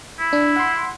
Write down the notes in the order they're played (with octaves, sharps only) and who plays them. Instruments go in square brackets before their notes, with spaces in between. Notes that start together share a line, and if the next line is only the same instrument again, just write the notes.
[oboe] E4
[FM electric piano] D4
F#5 C6